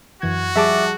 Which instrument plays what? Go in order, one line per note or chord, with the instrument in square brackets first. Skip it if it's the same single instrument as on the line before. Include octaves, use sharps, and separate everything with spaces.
[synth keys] F#2 E3 G#6 [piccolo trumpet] F#4
[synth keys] F3 G3 G#4 [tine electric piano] E5 A5 D6